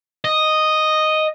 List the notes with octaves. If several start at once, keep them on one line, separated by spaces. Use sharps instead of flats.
D#5